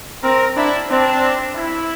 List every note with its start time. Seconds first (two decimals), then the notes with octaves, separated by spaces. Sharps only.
0.22 C4 A#4
0.56 D4 E4
0.89 C4 D4
1.56 E4